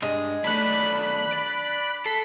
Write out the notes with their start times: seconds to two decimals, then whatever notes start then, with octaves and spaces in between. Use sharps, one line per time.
0.02 G2 G#3
0.44 B1 A3 D4 B5 F#6
1.33 D5
2.06 A4 B6 C7